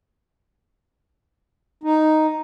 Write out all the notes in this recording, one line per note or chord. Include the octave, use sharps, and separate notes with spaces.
D#4